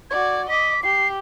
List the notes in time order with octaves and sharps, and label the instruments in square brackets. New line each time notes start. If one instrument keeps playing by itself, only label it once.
[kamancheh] F#4 D5 [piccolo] G#6
[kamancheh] D#5 D6 [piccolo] B6
[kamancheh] G4 [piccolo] C7